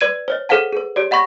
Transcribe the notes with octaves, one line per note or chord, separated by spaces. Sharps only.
B4 D5 G#6 D#7
C5 C#5 D#5
G#4 A4 C5 F5 F#5 A5
G#4 B4
G4 C#5 D5
D#5 F#5 B5 C#6 A#6